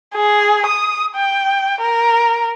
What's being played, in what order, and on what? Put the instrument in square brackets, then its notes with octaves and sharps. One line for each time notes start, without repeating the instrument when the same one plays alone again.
[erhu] G#4
D#6
G5
A#4